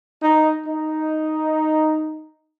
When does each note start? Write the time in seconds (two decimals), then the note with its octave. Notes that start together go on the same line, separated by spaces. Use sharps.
0.22 D#4
0.66 D#4